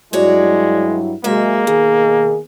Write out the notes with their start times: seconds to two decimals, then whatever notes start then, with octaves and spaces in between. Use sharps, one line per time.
0.13 G2 F#3 G#3 E4 F#4 C#5 D5
1.24 C3 F#3 G#3 A#3 E5
1.67 B2 D#3 G#4